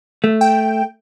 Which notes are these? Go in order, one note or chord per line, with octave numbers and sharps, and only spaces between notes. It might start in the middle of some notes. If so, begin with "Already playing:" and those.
A3
G5